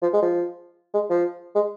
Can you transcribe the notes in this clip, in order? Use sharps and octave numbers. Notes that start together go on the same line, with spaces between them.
F3
G#3
F3
G#3
F3
G#3